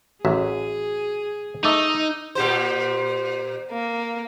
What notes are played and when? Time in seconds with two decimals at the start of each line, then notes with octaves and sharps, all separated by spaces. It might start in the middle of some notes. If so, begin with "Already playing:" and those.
0.25 A1 F#3 F#4 G#4 E5
1.65 A3 D#4 D6 E6
2.35 A#2 G4 C5
3.71 A#3